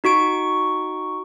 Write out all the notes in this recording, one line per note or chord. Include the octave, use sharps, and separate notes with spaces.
D#4 F#4 C#6 D7